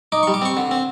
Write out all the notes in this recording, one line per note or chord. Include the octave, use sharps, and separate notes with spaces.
D#4 D6
C#6
G3
D6
C4 C#6
D3
C4